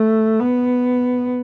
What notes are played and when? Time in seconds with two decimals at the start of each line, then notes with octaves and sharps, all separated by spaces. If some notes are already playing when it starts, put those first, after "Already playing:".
Already playing: A3
0.39 B3